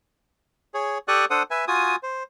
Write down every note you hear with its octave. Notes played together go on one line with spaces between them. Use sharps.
G#4 C#5
G4 A4 D5 C#6 D#6 F#6
D4 A4 C5 F#5 D#6
B4 E5 G#5
F4 F#4 G#5 D#6
C5